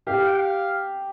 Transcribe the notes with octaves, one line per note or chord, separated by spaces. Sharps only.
G4 F5
G5
F5